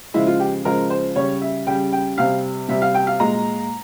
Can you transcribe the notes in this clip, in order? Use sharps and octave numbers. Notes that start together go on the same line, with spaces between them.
C#3 F3 G#3 E4
F4
G4
C#3 F3 G#3 A#4
C5
C#3 G3 C#5
E5
C#3 G3 G5
G5
C3 G3 F5
C3 G3 E5
F5
G5
F5
A#2 G#3 A#5